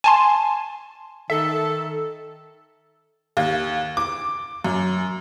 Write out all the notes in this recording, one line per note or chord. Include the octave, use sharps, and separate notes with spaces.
G#5 A5 C6
D#3 A4 E5
D#2
D6
F#2